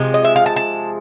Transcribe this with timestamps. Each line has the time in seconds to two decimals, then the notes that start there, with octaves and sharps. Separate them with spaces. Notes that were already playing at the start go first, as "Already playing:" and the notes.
Already playing: C3 F3 G#3
0.14 D#5
0.24 E5
0.36 F5
0.46 A5
0.56 A5